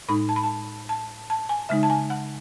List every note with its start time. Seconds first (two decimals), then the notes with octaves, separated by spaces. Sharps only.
0.08 A2 G#3 D#4 B5
0.29 A5
0.36 B5
0.44 A5
0.89 A5
1.30 A5
1.49 G#5
1.69 C#3 G#3 D#4 E5
1.83 A5
1.90 G#5
2.10 F#5